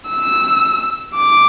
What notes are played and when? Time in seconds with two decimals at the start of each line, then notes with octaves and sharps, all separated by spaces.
0.10 E6
1.16 D6